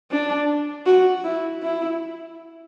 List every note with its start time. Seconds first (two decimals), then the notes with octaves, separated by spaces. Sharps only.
0.11 D4
0.86 F#4
1.24 E4
1.63 E4